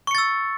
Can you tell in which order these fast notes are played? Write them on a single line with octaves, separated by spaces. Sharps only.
C#6 C#7 A6 E6